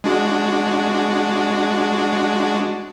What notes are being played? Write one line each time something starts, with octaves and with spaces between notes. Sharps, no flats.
G#3 D4 F#4